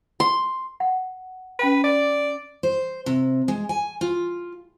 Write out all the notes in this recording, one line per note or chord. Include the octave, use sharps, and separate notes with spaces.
C6
F#5
C#4 B4 G5 B5
D5
C5
C3
G#3
G#5
F4